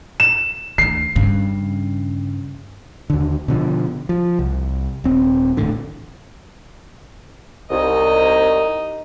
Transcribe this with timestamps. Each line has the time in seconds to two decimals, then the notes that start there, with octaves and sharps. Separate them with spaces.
0.20 E7
0.78 D2 D#3 C7
1.16 G2 C#3
3.10 D#2 D3
3.48 B2 D3 F3
4.09 F3
4.39 C2
5.04 D#1 C4
5.57 D#1 A1 A2 D3
7.71 C2 D#4 D#5